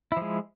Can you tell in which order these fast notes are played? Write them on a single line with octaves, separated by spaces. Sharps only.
E4 F3 G#3